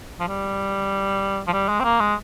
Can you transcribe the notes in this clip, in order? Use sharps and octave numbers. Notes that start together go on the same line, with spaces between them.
F3
G3
F3
G3
G#3
C4
A#3
G#3